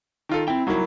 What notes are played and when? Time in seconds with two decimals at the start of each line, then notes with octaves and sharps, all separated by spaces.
0.29 D#3 F4 A4
0.48 C4 E4 G5
0.67 F#3 G3 A#3 D#4 E4 F#4